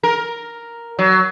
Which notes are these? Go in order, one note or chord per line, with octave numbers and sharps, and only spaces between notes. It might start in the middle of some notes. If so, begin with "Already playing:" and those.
A#4
F#3